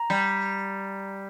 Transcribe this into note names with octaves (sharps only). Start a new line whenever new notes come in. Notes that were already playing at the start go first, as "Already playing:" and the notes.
Already playing: A#5
G3